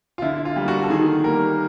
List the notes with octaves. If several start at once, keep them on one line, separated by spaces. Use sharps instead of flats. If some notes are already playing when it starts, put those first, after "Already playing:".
F4
D3 E4
F4
G3 A#3
F#4
A4
D#3 G#4
G3 A#3 A#4